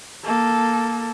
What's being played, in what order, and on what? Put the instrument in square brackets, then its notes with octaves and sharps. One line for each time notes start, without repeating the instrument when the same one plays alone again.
[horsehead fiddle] A#3 A4